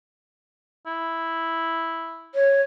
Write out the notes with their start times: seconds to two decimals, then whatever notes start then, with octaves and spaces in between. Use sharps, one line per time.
0.86 E4
2.35 C#5